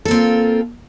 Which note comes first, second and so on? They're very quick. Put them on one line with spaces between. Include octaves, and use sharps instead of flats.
A4 A#3 C4 F4